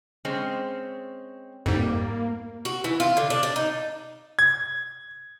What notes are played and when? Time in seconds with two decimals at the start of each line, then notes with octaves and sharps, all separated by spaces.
0.25 G#3 C4 C#4
1.66 F2 G#2 G3 A#3
2.65 F#4
2.84 E3
3.00 F4
3.17 D3
3.30 D4
3.43 D4
3.56 D#4
4.39 G#6